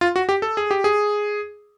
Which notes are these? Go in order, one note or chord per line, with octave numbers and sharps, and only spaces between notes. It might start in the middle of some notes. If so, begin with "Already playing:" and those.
F4
F#4
G4
A4
G#4
G4
G#4